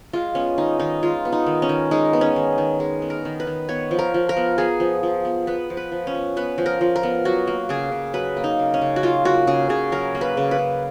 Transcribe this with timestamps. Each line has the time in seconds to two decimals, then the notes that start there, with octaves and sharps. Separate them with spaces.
0.13 G#3 F4
0.35 B3 C#4
0.58 D#3 D#4
0.79 D#3 D#4
1.03 G#3 F4
1.25 B3
1.32 D#4
1.47 D#3
1.62 C#4
1.69 D#3
1.91 G#3 D#4
2.13 B3
2.21 C#4
2.36 D#3
2.58 D#3
2.80 G#3
3.02 B3
3.10 A#4
3.25 D#3
3.40 B4
3.47 D#3
3.69 B3 C#5
3.91 F3
3.99 A#4
4.14 F3
4.29 A#4
4.37 B3
4.58 B3 G#4
4.80 F3
5.03 F3
5.25 B3
5.47 B3 B4
5.70 F3
5.77 B4
5.92 F3
6.07 C#4
6.15 B3
6.36 B3 B4
6.58 F3
6.66 A#4
6.81 F3
6.96 A#4
7.03 B3
7.25 F#3 F#4
7.47 A#3
7.69 C#3 G#4
7.92 C#3
8.14 F#3 B4
8.37 A#3
8.44 D#4
8.59 C#3
8.74 C#4
8.81 C#3
8.96 F#4
9.03 F#3 F4
9.25 A#3 F#4
9.47 C#3 G#4
9.69 C#3 G#4
9.92 F#3 A#4
10.15 A#3
10.21 B4
10.37 C#3
10.51 B4
10.59 C#3